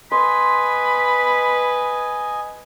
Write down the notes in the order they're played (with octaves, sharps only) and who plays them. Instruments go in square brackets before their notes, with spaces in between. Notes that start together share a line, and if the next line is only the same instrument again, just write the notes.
[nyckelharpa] B4 [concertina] D#5 G#5 [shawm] B5 [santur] C6